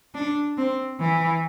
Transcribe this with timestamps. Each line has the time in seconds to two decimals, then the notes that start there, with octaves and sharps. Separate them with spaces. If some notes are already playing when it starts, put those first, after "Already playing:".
0.15 D4
0.57 C4
1.00 E3